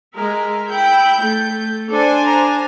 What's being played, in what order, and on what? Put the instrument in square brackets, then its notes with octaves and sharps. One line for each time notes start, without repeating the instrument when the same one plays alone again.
[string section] G#3 [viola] A#4 E5
[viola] E4 G5 [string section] G6
[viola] A3
[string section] D4 C5 G#5 [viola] A4
[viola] A#5